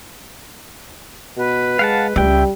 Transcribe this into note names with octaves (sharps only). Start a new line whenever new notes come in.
B2 B4
G#3 F5 F#5 A5
C#2 G3 E5 G5